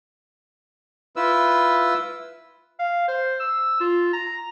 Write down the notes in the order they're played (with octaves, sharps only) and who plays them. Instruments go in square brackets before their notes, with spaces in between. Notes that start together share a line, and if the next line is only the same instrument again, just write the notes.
[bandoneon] E4 F4 B4 E6
[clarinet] F5
C5
E6
F4
A#5